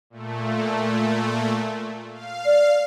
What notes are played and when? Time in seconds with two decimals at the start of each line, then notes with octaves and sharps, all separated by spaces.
0.10 A#2 A3
2.12 F5
2.46 D5